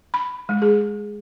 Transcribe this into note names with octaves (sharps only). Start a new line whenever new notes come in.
B5
G#3
G#4